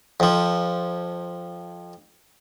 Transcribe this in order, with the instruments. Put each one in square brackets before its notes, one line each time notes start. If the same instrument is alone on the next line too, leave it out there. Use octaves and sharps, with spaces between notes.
[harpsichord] F2 F3